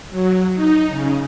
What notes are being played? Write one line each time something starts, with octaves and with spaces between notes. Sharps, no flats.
F#3
D#4
C#3